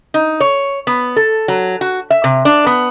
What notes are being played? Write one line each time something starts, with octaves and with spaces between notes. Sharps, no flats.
D#4
C#5
B3
A4
F#3
F#4
E5
C3
D4
B3